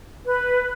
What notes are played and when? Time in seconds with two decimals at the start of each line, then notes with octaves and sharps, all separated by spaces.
0.25 B4